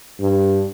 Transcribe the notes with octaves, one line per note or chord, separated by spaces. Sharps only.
G2